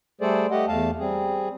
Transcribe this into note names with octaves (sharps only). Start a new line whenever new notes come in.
G3 A3 G#4 A4 C5 D5
A3 G4 D#5 F#5
E2 A3 F5 A5
G3 C4 G#4